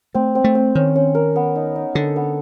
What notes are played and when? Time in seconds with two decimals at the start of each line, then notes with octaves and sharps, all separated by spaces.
0.14 A3 C4
0.35 C4
0.44 A3
0.55 C4
0.75 D#3 C#4
0.95 C#4
1.15 A#4
1.36 B3
1.55 D#4
1.76 D#4
1.95 D3 A4
2.16 B3